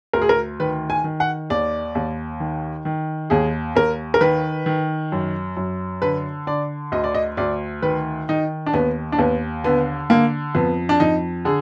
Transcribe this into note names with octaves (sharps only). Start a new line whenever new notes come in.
D2 A#4
G#4
A#4
D#3 B4
G#5
D#3
F#5
D#2 D5
D#2
D#3
D#3
D#2 G#4
D#2 A#4
A#4
D#3 B4
D#3
F#2
F#2
D3 B4
D3 D5
D2 D#5
D5
D#5
D2 D5
D#3 B4
D#3 D#4
D4
D#2 B3
D4
D#2 B3
D3 B3
D3 A#3
F2 B3
D4
F2 D#4
D3 G#4